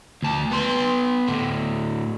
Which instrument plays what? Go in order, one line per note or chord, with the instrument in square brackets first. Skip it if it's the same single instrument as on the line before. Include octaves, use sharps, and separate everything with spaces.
[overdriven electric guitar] D2 A5
B3 C6
A2 D3